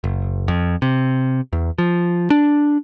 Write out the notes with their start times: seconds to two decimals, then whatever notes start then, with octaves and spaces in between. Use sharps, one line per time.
0.04 F#1
0.48 F2
0.82 C3
1.53 E2
1.78 F3
2.30 D4